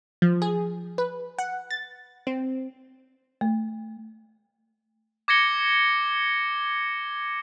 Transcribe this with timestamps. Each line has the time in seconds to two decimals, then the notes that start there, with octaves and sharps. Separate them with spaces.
0.22 F3
0.42 G#4
0.98 B4
1.39 F#5
1.71 A6
2.27 C4
3.41 A3
5.28 D6 G#6 A#6 C#7 G7